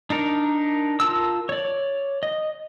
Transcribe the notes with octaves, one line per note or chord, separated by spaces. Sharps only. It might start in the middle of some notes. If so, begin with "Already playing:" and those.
D4 D#4 A#4
F4 A#4 A5 E6
C#5 D5
D#5